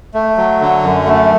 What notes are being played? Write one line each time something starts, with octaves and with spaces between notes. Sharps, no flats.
A3
F#3
D3
F#2
A3